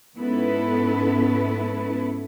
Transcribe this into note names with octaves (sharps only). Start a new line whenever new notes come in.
G#2 B3 C#4 E4 A4 B4